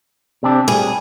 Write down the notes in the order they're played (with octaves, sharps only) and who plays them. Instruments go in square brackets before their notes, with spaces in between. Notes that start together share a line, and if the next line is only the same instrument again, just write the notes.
[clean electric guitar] C3 C4 D4
[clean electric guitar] G3 [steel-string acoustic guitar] G#4